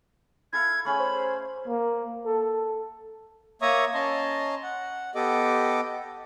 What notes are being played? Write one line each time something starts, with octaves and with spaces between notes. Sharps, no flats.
E4 A4 F5 G#6
A3 C#4 G#4 B5
C5
A#3
A4
A#3 C#5 E5 A#5 C#6 D#6
C#4 D#5 A5 A#5 C6
F#5
B3 G4 A4 D#5 D6